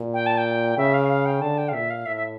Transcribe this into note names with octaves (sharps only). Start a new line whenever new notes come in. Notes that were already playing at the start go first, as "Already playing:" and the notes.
Already playing: A#2
G5
A5
G5
C#3 E5
F5
F5
G5
D3 A5
G5
F5
A#2 E5
F5
A2 E5
E5